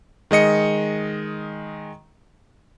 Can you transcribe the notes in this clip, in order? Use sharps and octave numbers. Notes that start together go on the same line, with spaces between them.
D#3 G#3 D#5 C#7